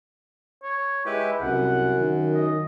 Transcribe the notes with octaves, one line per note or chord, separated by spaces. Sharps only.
C#5
G#3 E4 G4 B4
C2 F#2 F#5
D#3
D#5